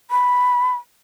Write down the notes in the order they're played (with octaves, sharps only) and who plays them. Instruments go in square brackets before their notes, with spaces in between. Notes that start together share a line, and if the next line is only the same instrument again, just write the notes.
[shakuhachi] B5